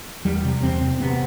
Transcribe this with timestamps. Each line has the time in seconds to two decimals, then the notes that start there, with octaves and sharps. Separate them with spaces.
0.25 E2 G3
0.44 C3
0.63 E2 C4
0.81 C3
1.00 C3 B3